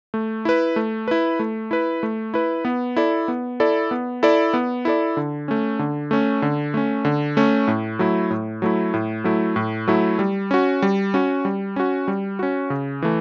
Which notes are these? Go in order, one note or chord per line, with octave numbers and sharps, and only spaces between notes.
A3
E4 B4
A3
E4 B4
A3
E4 B4
A3
E4 B4
B3
E4 A4 D5
B3
E4 A4 D5
B3
E4 A4 D5
B3
E4 A4 D5
D3
A3 C#4
D3
A3 C#4
D3
A3 C#4
D3
A3 C#4
A2
F#3 A3 E4
A2
F#3 A3 E4
A2
F#3 A3 E4
A2
F#3 A3 E4
G3
C#4 F#4
G3
C#4 F#4
G3
C#4 F#4
G3
C#4 F#4
C#3
E3 A3